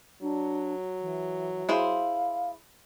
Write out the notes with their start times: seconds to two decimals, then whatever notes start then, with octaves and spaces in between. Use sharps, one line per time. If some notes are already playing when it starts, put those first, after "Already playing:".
0.22 F#3 D4
1.02 E3
1.69 E4 G#4 C5 F5